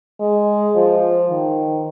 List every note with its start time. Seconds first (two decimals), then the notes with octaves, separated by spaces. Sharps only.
0.21 G#3
0.75 F3
1.30 D#3